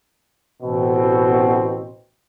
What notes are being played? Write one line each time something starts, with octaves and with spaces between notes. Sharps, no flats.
A1 B2 C4